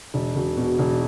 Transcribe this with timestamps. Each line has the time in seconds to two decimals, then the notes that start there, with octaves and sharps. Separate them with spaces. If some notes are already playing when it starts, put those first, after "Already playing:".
0.14 E1
0.36 E1
0.57 B2
0.79 E1